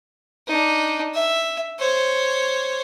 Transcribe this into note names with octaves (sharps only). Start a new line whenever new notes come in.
D4 D#4
E5
C5 C#5